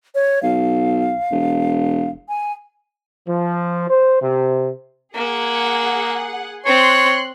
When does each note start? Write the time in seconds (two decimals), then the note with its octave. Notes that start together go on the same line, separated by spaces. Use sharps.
0.15 C#5
0.43 B1 F5
1.31 E1
2.29 G#5
3.28 F3
3.89 C5
4.22 C3
5.15 A#3 G#4 F#5
6.66 C4 C#5 C6 F#6